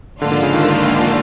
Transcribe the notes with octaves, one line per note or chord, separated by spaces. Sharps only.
G#2 D3 F3 A#3 D4 F4
D3
C#3
D#3
D3